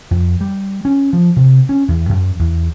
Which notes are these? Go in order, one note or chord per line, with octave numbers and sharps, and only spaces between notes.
F2
G3
C#4
F3
C3
C#4
E2
F#2
E2